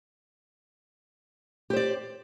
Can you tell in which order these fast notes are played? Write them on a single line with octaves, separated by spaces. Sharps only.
G4 C5 D5